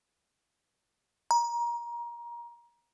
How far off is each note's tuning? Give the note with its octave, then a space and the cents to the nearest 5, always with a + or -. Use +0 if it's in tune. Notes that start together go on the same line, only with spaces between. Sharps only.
A#5 +25